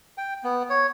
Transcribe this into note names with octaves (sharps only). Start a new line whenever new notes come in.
G5
B3
C#5